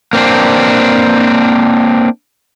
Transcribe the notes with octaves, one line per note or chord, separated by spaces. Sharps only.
A#3 C4 D4